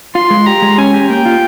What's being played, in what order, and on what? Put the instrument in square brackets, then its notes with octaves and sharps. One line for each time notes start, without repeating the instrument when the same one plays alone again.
[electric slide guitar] F4 [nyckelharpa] C6
[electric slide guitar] G#3
[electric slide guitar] G4 [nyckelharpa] A#5
[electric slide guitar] G#3
[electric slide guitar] C#4 [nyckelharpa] G#5
[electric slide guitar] G4
[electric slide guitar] A#3 [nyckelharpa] G5
[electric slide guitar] F4